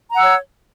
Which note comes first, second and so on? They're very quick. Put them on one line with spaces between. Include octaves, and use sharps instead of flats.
A#5 F#5 E6 C#5